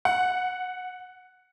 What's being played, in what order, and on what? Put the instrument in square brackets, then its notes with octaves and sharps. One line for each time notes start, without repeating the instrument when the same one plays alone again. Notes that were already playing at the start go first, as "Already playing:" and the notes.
[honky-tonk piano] F#5